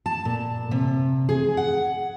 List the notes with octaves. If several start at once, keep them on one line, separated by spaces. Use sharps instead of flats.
A5
A#2
C3
G#4
F#5